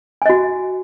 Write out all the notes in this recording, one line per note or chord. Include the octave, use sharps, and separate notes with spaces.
F#4 D#5 G#5